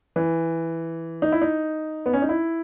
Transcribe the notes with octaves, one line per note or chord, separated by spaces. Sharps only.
E3
D#4
E4
D#4
B3
C#4
D#4
E4